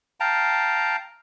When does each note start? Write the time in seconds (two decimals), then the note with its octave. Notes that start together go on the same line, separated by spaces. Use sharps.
0.20 F5 G5 A5 A#5